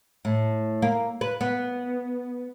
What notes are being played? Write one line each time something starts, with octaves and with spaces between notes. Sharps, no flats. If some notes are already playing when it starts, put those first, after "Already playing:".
A2
A#3
B4
B3